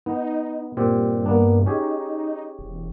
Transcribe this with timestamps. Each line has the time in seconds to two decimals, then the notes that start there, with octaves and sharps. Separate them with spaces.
0.06 B3 D#4
0.77 G2 A#2 C4 G4
1.26 A#3 B3 D4
1.66 C#4 D#4 G4 G#4
2.59 E1